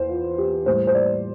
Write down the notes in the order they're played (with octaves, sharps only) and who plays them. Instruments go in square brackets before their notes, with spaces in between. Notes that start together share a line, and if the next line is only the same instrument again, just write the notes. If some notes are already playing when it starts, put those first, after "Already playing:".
Already playing: [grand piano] E2 E3 C5
F4
G4
A2 G3 C5
C5
D5